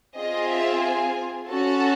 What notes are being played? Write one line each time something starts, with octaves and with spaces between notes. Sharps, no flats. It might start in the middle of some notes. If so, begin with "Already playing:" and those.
C4 F4 G#4 D#5
E5
G#5
C#4 F#4 A4 A5